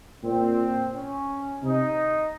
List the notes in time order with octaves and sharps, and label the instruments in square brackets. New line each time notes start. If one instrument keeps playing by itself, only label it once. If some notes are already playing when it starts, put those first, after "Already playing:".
[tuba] A#2 [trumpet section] C4
[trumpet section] C#4
[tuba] C3 [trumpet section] D#4